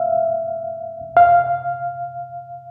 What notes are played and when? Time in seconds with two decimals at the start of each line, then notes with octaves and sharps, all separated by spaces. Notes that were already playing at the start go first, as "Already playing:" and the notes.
Already playing: E5 F5
1.17 F5